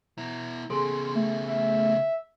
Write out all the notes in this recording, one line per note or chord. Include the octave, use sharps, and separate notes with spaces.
B2 E4 A#5
C#3 B3 G#4 A4 C6
A3
E5